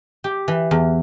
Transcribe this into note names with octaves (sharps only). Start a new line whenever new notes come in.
G4
E3
E2